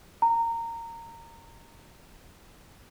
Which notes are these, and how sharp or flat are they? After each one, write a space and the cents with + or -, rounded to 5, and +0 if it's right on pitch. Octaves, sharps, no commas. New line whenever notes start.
A#5 -20